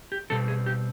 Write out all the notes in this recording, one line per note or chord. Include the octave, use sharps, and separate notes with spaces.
G4
B2 G3 C4 A4
G#4
G4